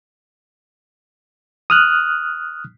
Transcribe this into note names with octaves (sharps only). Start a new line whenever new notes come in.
D#6 F6 F#6